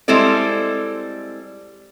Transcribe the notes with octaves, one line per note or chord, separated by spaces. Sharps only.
G3 G#3 C4 E4 A4 D5